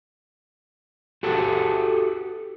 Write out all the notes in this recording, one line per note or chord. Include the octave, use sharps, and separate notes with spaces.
F#4 G4 A4